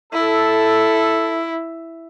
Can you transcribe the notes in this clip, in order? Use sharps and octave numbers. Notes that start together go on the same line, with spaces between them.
E4 A4